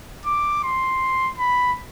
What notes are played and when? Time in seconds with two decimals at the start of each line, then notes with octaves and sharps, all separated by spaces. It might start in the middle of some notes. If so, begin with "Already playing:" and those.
0.26 D6
0.64 C6
1.38 B5